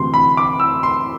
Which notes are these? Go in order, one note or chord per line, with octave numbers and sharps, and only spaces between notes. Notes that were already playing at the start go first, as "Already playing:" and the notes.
Already playing: D2 C3 E3 C6
B5
D6
E6
C6